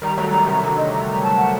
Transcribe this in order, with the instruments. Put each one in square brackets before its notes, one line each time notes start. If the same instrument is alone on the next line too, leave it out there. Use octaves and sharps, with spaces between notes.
[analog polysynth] D#3 G3 [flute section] A#5
[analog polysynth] F#3 A3 [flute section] A#5
[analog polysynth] D#3 G3 [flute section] A#5
[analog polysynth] C3 D#3 [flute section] A#5
[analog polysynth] D3 F#3 [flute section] A#5
[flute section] D#5
A#5
A#5
A5
F#5